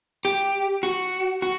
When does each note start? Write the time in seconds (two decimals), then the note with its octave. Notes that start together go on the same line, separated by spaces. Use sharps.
0.25 G4
0.83 F#4
1.42 F#4